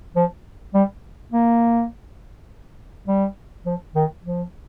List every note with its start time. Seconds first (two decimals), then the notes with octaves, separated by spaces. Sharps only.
0.16 F3
0.74 G3
1.32 A#3
3.07 G3
3.66 F3
3.95 D#3
4.25 F3